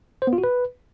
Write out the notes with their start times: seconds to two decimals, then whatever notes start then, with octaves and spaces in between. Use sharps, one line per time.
0.22 C5
0.27 B3
0.33 F4
0.38 F#4
0.44 B4